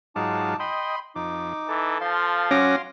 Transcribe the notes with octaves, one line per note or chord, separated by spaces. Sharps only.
G#2 F#3 D#4 F4 A5 D6
D#5 G5 B5 C6
F2 D#4 D6
E3 A4
F3 F5 C6
F#3 C#4 F#4 D6 A#6